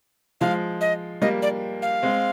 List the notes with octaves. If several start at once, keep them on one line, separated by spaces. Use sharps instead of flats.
F3 G#3 F5
D#5
G3 A#3 D#5
D5
F5
G#3 C4